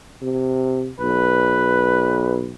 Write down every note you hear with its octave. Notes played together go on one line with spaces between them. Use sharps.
C3
B1 B4